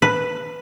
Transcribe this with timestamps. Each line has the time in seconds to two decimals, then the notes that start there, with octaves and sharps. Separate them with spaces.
0.02 B4